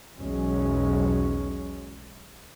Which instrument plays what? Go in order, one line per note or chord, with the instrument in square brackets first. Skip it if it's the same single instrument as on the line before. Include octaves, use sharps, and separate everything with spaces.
[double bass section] B1 E2 F#3 G#3 C#4